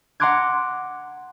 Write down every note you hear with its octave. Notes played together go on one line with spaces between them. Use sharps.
F#5 A#5 C6 D6 F#6 G#6